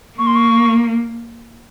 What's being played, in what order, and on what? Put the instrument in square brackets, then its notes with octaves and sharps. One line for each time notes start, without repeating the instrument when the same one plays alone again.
[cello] A#3 [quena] C#6
[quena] C6
C#6